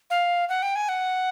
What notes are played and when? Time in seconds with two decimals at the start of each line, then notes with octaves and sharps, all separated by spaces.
0.10 F5
0.49 F#5
0.62 G5
0.76 G#5
0.89 F#5